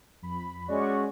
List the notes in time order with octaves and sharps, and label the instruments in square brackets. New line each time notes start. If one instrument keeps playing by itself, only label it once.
[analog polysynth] F2 B5
[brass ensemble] G#3 C#4 F#4 [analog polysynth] D5 C#6